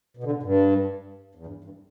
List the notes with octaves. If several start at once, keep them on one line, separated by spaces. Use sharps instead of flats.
B2
D3
B2
G2
E2
G2
G2